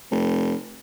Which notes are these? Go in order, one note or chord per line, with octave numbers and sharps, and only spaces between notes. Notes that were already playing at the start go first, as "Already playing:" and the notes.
F1